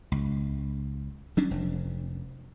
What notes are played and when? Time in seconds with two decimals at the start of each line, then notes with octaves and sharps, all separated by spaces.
0.12 C#2
1.37 F#3 C#4 D4
1.51 F1